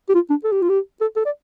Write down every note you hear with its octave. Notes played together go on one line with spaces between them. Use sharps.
G4
F4
D4
A4
G4
F4
G4
A4
A4
D5